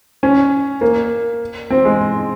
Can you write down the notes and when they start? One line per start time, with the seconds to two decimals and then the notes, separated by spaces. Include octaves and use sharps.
0.23 C#4
0.81 A#3
1.70 C4
1.85 G#3